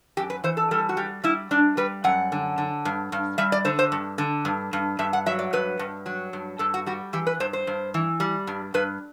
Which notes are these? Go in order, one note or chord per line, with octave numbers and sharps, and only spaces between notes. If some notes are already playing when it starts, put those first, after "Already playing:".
F#2 G4
B4
E3 C5
A4
G3 A4
F#4
G3 G4
G3 E4
G3 D4
G3 B4
F#2 F#5
D3
D3
G2
G2
G3 E5
D5
D3 C5
C5
G2
D3
G2
G2
G2 E5
F#5
F#3 E5
D5
G2 B4
G2
F#3
G2
G2 A4
F#4
G3 F#4
E3 G4
B4
G2 C5
C5
G2
E3
G3
G2
G2 B4